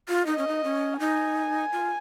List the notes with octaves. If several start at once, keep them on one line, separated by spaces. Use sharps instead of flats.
F4
D#4 D#5
C#4
D#4
C#4
D#4 G#5
F4